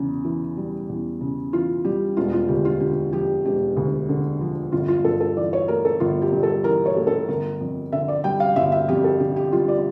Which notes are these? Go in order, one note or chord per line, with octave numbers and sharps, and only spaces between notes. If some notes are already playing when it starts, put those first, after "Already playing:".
Already playing: E2 C#3
E3
G3
E2
C#3
E3 F4
G3 G4
E1 F4
F4
D2 G4
F4
D3 G4
F3 G4
E1 G4
D2
D3
F3
G1 F4
F4
G2 A4
A4
E3 D5
C#5
A3 A#4
A4
G1 F4
G4
G2
A4
E3 A#4
C#5
A3
A4
G1 A#4
F2
D3 E5
D5
G3 G5
F5
G1 E5
E5
F2 G4
A4
D3 G4
G4
G3 F4
D5